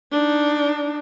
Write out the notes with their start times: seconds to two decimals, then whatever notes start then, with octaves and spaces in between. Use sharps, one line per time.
0.11 D4 D#4